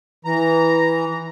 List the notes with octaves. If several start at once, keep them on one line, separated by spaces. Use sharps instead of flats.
E3 A#5